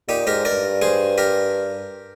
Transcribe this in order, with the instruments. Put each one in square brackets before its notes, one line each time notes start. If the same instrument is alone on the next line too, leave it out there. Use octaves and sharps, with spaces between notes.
[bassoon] A#2 [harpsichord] D#4 G4
[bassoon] G#2 [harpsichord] G4 A#4
[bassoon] G2 [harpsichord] A#4 D5
[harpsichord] G#4 C5
G4 A#4